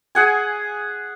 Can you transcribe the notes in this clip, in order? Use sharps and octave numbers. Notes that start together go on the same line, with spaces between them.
G#4 F#5 G#5